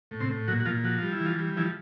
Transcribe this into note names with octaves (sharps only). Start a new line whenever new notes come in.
A2
C3 C4
A2
A#2 F#3 F#4
F#4
A#2 F3 F4
F3 F#4
G3 F4
E4
E3
F3 F4
G3
E3 F3 E4